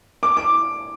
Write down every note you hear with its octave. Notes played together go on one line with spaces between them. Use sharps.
D6
D6